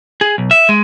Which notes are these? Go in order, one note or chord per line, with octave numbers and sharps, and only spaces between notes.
G#4
B1
E5
G#3